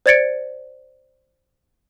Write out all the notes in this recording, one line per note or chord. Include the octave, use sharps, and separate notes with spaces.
C5 D5 G#6 A6 C#7 D7